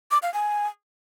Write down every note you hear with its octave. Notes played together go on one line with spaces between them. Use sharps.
D6
F5
G#5